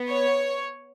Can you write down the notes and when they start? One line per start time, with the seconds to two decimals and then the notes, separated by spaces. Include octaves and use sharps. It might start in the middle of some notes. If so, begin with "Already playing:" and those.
Already playing: B3
0.10 C#5